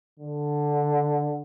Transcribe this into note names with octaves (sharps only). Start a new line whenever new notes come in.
D3